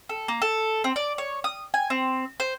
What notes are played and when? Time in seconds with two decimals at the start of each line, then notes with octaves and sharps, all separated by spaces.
0.09 A4
0.28 A#3
0.42 A4
0.84 C4
0.96 D5
1.18 C#5
1.44 D#6
1.74 G#5
1.90 C4
2.40 C5